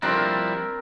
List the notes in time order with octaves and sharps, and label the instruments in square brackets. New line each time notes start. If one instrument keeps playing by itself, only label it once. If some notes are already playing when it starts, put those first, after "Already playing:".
[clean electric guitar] F3 G3 E4 [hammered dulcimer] C4 D4 A#4